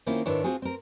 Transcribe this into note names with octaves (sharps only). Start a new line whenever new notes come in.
D#3 A#3 C4 C#4 E4 F4
G#2 D#3 D4 E4 B4 C#5
C4 F4 F#4 G#4
C4 A#4